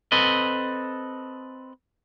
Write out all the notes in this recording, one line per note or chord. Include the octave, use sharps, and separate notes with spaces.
C4 A4 B4 D#5